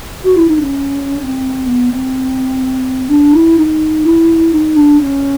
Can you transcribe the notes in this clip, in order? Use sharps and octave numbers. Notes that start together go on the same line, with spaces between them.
F#4
E4
D#4
C#4
C#4
C4
B3
C4
D4
E4
D#4
E4
D#4
D4
C#4